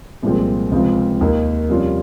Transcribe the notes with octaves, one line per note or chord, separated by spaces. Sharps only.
C2 A#2 F3 G#3 C4
C#2 C3 F3 G#3 C4
D#2 D#3 A#3 D#4
F2 C3 G3 C#4 F4